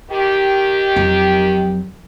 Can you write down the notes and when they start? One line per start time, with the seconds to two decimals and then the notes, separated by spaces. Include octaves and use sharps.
0.10 D#3 G4
0.96 F2 F#3